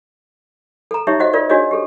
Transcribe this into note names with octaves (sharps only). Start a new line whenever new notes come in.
A4 A#5
D#4 G4 C#5 E5
F#4 C5 D#5 F#5
F4 A#4 D5
D4 F#4 G#4 C#5 D#5
G4 A4